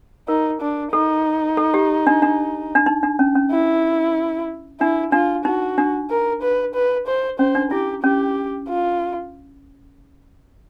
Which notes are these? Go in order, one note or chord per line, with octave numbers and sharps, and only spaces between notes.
D#4 A#4
D4
D#4 A4
A4
G4
D4
D4
D4
D#4
D4
C#4
C#4
E4
D4 E4
D4 F4
D#4 F#4
D4
A#4
B4
B4
C5
C#4 C5
D4
E4 G4
C#4 G4
F4